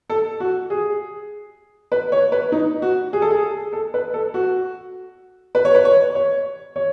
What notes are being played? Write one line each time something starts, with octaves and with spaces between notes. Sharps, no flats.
A4
F#4
G#4
B4
C#5
B4
D#4
F#4
G#4
A4
G#4
A4
B4
A4
F#4
B4
C#5
B4
C#5
C#5
C#5